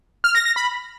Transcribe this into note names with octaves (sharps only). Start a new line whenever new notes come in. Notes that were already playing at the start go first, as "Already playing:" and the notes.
F6
A#6
A#6
B5